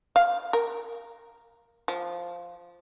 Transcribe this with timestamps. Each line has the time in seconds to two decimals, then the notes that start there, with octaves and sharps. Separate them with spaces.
0.16 F5
0.53 A#4
1.88 F3